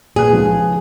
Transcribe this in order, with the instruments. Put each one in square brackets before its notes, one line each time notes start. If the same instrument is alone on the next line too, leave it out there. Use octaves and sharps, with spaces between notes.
[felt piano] A#2 B4 F#6 [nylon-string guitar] G#4
[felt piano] C#2 F3 G#3